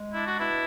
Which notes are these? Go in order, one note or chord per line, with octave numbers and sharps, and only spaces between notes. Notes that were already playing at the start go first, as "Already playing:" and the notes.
Already playing: G#3
D4 E4
F#4
B2 E4